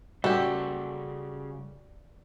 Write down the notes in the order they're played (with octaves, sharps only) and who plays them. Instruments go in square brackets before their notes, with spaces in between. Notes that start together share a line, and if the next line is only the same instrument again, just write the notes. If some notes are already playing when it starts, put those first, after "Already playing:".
[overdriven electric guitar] C#3 G5 [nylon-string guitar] G3 [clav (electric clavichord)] F#4 [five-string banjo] G4 A4